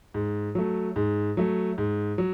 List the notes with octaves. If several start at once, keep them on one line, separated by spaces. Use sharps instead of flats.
G#2
F#3 A3
G#2
F#3 A3
G#2
F#3